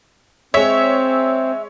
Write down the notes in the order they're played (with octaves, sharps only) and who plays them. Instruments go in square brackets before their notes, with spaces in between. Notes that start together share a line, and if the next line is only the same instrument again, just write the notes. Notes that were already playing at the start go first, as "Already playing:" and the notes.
[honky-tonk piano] G#3 C#5 [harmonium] C4 [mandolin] E5